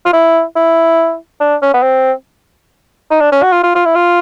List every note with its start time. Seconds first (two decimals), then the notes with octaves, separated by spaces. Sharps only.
0.05 F4
0.13 E4
0.56 E4
1.40 D4
1.62 C#4
1.74 B3
1.83 C4
3.11 D#4
3.21 D4
3.32 C#4
3.43 F#4
3.53 F4
3.63 F4
3.75 F4
3.85 E4
3.95 F4